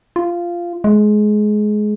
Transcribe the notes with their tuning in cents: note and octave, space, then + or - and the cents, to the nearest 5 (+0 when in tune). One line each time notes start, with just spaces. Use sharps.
F4 -10
G#3 +20